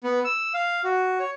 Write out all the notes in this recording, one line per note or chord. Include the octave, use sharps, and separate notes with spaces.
B3
E6
F5
F#4
C#5